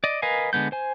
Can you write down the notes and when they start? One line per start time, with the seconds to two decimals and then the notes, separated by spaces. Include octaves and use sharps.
0.04 D5 D#5
0.22 A#4 B4 D#5 F5 G#5
0.53 D3 G#3 B3 G6
0.72 C5 G#5